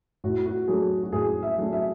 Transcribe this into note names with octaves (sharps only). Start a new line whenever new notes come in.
A2 F#4
F#4
F#3 A3 D4 G#4
F#4
A2 G#4
E5
F#3 A3 D4
E5